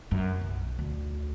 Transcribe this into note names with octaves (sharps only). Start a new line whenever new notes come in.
F#2
B1
D2